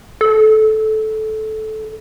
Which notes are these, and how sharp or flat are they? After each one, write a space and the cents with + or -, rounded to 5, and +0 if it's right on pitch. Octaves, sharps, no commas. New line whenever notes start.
A4 -15